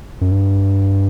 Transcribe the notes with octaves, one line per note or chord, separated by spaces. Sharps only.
F#2
G2